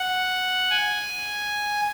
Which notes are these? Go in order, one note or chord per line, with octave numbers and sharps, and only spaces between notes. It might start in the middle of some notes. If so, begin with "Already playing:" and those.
Already playing: F#5
G#5